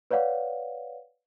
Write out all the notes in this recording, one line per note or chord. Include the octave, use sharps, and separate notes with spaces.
B4 C#5 D5 F5 F#5